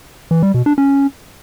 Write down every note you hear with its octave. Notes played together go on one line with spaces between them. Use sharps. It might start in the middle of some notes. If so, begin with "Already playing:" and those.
E3
G3
B2
D4
C#4